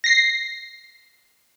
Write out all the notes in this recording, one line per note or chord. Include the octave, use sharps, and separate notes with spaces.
A#6 C7